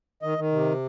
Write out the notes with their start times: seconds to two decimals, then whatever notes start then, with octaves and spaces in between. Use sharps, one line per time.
0.22 D#3 D#5
0.38 D#3
0.52 C3